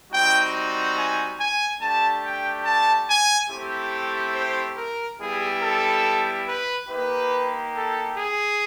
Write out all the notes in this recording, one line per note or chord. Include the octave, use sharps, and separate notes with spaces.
G3 C4 D#4 F#4 G5
G#5
G#5
A3 D4 G4 A5
G5
A5
G#5
A3 C4 E4 G4
C5
A#4
G3 B3 E4 G4 G#4
A4
B4
A#3 D#4 G4 B4
A4
G#4